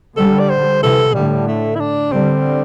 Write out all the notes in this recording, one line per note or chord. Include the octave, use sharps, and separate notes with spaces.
D3 G3 A4
D5
C5
C3 E3 A4
A2 D3 G3
A3
E4
D4
D3 G3 C4